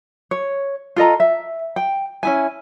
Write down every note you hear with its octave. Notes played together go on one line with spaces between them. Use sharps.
C#5
F4 A4 D#5 A#5
E5
G5
C#4 E4 G#5